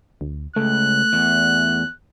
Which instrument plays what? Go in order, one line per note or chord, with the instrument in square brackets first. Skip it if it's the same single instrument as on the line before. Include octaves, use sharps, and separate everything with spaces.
[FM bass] D2
[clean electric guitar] C#2 [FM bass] A3 [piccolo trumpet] F#6
[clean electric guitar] E2